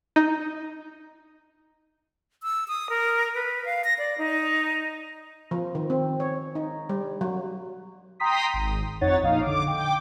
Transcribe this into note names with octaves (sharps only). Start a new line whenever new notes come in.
D#4
E6
D#6
A#4
B4
F5
A#6
D5
D#4
F3
D#3
C4
C#5
D#4
G3
F#3
G5 A#5 C6 D#6 B6
G#1
F2 D#4 C#5 F#5 A6
A#1 D#4 F5 D#6
D3 D6
G5 D6